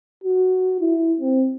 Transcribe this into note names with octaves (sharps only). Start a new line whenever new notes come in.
F#4
E4
C4